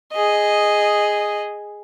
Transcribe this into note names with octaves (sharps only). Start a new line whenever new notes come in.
G#4 D#5